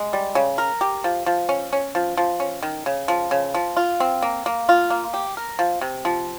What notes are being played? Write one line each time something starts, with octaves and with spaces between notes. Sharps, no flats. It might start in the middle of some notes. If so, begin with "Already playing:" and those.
Already playing: G#3
G3
C#3
A#4
G4
F3
F3
C#4
C#4
F3
F3
C#4
D#3
C#3
F3
C#3
F3
F4
C4
A#3
A#3
F4
A#3
G4
A#4
F3
C3
F3